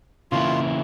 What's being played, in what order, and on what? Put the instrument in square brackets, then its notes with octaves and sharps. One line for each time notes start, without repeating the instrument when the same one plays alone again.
[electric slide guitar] C#3 E3 A#3 E4 [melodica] F4